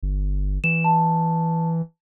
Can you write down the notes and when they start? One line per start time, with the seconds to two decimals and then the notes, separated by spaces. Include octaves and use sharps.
0.03 G1
0.64 E3 E7
0.84 A5